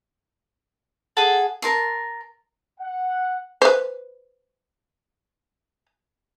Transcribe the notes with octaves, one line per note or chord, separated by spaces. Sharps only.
G#4 A4 F#5
A#4 A5 C6
F#5
B4 C5